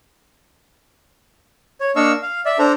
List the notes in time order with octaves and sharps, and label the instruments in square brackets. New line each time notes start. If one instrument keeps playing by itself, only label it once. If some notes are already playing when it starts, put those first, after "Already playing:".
[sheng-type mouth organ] C#5
A#3 D4 D#5 F5 C#6 E6
F5
D5 E5
D4 A4 C5 A#5